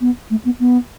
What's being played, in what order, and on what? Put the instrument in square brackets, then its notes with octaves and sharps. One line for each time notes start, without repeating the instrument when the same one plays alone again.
[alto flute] B3
A3
B3
B3